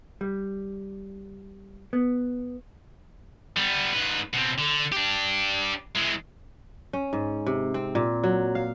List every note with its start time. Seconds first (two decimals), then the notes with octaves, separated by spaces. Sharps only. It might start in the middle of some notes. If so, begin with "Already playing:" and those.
0.21 G3
1.93 B3
3.57 G3 B3
3.93 G#2 B4
4.33 B2 C4
4.58 D3
4.92 D4 G4
5.95 E3 G#3
6.93 C#4
7.13 G#2
7.47 C3
7.74 C4
7.95 A#2
8.24 F#3
8.55 F5